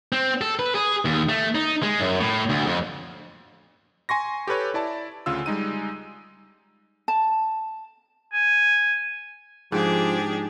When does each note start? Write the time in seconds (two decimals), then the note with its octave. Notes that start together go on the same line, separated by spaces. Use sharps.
0.12 C4
0.41 A4
0.59 B4
0.75 G#4
1.05 D#2
1.29 A3
1.55 D#4
1.83 G#3
2.00 F#2
2.20 A2
2.49 D2
2.66 F2
4.09 G#5 C6 C#6 A#6
4.47 G4 A4 B4 C#5
4.74 E4 D5 A5
5.26 D2 C#3 F4 E6
5.46 G3 G#3 D#4 D#7
7.08 A5
8.33 G#5
9.72 G#2 F3 D4 G4 G#4